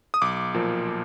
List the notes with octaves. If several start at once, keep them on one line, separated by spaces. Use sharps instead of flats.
D#6
B1 D6
A#2 F3 A#3